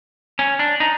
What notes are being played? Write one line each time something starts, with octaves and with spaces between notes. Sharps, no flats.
C#4
D4
D#4